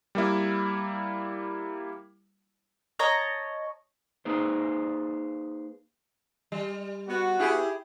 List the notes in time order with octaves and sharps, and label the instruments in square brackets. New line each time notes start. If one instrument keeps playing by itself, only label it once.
[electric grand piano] G3 A#3 E4
[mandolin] C#5 D#5 A5 A#5
[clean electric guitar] A#3 D#4 G#4 B4 C5
[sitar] G3
[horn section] B3 F#4
[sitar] E4 G4 G#4